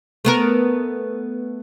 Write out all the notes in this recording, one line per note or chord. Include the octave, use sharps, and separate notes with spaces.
A3 B3 A#4